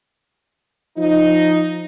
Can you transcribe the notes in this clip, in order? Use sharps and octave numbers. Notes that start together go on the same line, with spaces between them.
F3 D#4